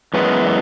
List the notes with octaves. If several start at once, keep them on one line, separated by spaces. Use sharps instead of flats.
F#2 E3 G#3 B3